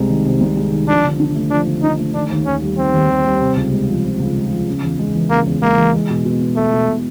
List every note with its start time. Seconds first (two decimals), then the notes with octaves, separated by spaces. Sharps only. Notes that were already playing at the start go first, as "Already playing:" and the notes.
Already playing: C2 C3 G#3
0.09 D#3
0.25 C3
0.41 C2
0.57 G#3
0.72 D#3
0.88 F3 D4
1.04 D3
1.19 D4
1.35 A3
1.51 F3 D4
1.67 D3
1.83 D4 D#4
1.99 A3
2.14 D#3 D4
2.30 D#2
2.46 D#2 C#4
2.62 G3
2.78 D#3 C4
2.93 D#2
3.09 D#2
3.25 G3
3.41 C3
3.56 C#2
3.72 G#3
3.89 F3
4.04 C3
4.20 C#2
4.36 G#3
4.51 F3
4.68 C#3
4.83 E2
4.99 G#3
5.15 E3
5.30 C#3 A#3
5.46 E2
5.62 G#3 A#3
5.77 E3
5.93 G#3
6.10 B2
6.25 B2
6.41 B3
6.56 G#3 A3
6.73 B2
6.89 B2